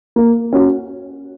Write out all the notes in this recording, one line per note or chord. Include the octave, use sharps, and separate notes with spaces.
A#3
C#4 F#4